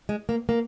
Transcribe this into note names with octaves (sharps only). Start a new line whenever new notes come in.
G#3
A#3
A#3